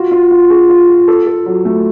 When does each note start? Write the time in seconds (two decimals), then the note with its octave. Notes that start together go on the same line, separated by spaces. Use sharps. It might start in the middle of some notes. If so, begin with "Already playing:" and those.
Already playing: F4 F#4
0.11 F4
0.31 F4
0.50 G#4
0.69 F4
0.88 F4
1.08 A4
1.26 A4
1.46 F#3
1.65 A3